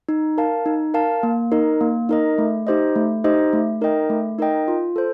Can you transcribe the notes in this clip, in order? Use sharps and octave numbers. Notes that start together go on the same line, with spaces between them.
D#4
A#4 F5 A5
D#4
A#4 F5 A5
A#3
D#4 A#4 D#5
A#3
D#4 A#4 D#5
A3
D#4 G4 C5 D#5
A3
D#4 G4 C5 D#5
A3
D#4 A#4 D#5 G5
A3
D#4 A#4 D#5 G5
F4
A4 C5